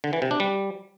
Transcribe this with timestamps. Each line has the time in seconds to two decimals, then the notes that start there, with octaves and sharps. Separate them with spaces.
0.04 D3
0.13 E3
0.22 C3
0.31 D4
0.40 G3